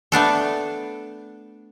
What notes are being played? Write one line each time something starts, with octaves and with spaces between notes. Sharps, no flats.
A3 B3 D4 A4